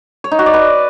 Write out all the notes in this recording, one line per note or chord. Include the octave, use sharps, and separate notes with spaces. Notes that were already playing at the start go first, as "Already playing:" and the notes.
C#5
D#4
F#4
D5
B4